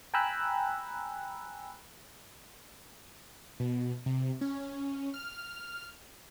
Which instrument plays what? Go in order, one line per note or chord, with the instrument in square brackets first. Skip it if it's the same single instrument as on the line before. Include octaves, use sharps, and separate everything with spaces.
[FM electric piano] G5 G#5 A#5 B5 E6 F#6
[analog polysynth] B2
C3
C#4
C#4
F6